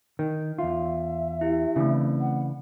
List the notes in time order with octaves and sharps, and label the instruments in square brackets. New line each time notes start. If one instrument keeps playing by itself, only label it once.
[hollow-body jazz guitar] D#3
[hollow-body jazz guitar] E2 F4 [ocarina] E5
[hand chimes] E4 G4
[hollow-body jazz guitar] C#3 E3 D4 [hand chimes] A3 C4
[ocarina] F#5